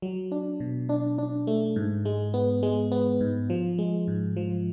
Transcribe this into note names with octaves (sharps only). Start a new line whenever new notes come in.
F#3
D4
B2
D4
D4
A3
G#2
G#3
B3
G#3
B3
G#2
F3
G#3
G#2
F3